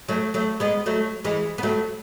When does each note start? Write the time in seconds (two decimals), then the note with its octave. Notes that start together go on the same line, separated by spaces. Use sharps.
0.08 F#3 A3
0.34 F#3 A3
0.60 G#3 B3
0.86 F#3 A3
1.24 E3 G#3
1.58 B3
1.63 F#3 A3